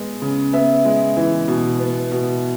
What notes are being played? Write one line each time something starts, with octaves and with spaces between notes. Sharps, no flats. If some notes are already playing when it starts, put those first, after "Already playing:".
Already playing: G#3 B3
C#3
B3 E5
G#3
E3
B2
B3
B2